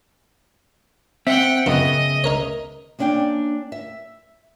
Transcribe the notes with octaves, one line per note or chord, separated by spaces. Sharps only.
C4 E5 F#5 G5
F#2 C#3 B3 F4 D#5
D#4 A#4 C#5
A#3 C#4 D4 D5 G5
E5